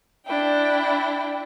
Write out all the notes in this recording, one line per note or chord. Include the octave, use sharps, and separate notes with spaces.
D4 E4 G5